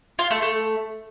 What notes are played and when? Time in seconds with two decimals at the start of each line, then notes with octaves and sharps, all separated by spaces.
0.19 F4
0.31 A3
0.42 A3